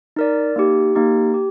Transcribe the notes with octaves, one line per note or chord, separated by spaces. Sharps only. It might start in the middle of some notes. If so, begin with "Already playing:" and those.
D#4 A#4 D5
A#3 D#4 G4
A#3 D#4 G4
G4